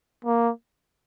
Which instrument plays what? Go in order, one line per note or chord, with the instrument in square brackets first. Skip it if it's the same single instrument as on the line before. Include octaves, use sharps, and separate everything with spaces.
[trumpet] A#3